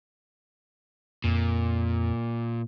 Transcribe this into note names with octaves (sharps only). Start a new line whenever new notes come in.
F2 A#2